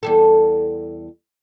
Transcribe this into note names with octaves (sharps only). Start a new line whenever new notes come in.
E2 G3 A4